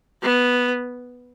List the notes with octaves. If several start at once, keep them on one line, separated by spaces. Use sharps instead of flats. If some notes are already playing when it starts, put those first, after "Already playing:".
B3